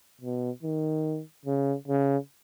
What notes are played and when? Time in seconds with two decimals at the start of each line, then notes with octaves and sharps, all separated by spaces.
0.21 B2
0.63 D#3
1.46 C#3
1.88 C#3